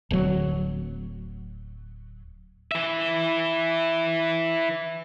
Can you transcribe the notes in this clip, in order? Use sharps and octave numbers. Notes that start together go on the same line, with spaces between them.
D1 F#3
E3 E5